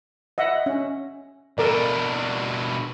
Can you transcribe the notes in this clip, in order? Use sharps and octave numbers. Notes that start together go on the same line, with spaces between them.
D#5 E5 F#5
C#4
B2 D4 A4 A#4 D5